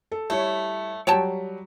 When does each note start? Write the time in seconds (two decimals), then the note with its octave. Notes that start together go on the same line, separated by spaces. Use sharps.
0.11 A4
0.30 G3 A3 E4 C#5
1.07 F#3 G3 C#5 G5 A5